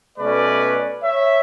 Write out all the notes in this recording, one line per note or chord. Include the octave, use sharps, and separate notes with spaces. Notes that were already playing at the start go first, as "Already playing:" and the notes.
B2 A3 C#4 B4 D5
C#5 E5